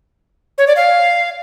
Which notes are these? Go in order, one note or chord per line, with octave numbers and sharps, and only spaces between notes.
C#5
D5
F5